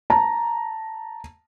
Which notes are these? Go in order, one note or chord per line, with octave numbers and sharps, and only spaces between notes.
A5 A#5